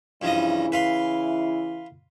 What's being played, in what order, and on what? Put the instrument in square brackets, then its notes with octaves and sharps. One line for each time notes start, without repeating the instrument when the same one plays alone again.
[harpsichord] G2 F3 D#5 [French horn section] C#3 E3 E4
[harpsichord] B4 F5 C6